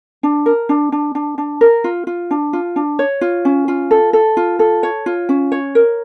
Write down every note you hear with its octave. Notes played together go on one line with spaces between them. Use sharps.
D4
A#4
D4
D4
D4
D4
A#4
F4
F4
D4
F4
D4
C#5
F4
C#4
F4
A4
A4
F4
A4
C#5
F4
C#4
C#5
A#4